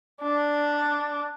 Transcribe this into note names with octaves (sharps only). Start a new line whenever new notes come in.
D4